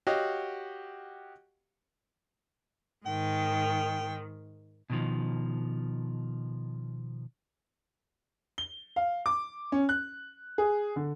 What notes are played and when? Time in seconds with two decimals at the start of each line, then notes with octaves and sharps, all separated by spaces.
0.07 F#4 G4 C#5 D#5 F5 F#5
3.06 G#2 D#3 G5
4.90 B2 D#3 F3
8.58 G7
8.96 F5
9.26 D6
9.72 C#4
9.89 F#6
10.58 G#4
10.96 D3